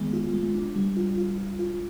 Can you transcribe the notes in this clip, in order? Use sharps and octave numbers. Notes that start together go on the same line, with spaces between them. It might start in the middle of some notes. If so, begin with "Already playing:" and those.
Already playing: D#3 G#3 B3
F4
G#3
D4
G3
F4
F4
F4
F4